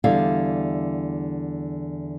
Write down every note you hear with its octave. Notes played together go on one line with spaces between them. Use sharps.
E2 D3 G3 E5 F5